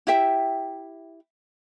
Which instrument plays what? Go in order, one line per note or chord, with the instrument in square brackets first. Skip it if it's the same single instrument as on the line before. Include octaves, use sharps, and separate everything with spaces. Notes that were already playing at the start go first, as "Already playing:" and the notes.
[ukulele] E4 G4 E5 G5